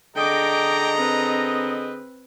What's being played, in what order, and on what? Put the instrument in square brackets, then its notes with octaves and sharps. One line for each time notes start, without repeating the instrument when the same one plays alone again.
[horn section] D3 G#4 D#5 [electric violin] G5 D6 [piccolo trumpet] A#5
[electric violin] C4 B4